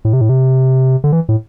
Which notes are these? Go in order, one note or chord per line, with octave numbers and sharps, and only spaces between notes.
A2
C3
A2
C3
D3
E3
A2